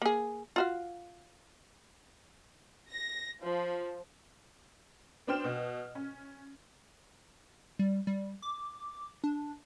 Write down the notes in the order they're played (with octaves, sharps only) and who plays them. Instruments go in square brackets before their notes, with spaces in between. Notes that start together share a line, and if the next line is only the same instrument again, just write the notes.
[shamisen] A#3 G#4
F4 F#4 F5
[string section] A#6
F3
[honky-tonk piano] B3 D4 C5 G5 F6 E7
B2
C#4
[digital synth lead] G3
G3
D6
D4